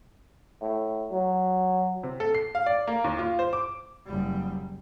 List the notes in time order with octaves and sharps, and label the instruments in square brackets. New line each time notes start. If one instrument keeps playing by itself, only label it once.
[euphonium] A2
F#3
[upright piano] C3
A4
C7
F5
D5
A#3
D#2
F4
C5
D6
[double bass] F#1 G3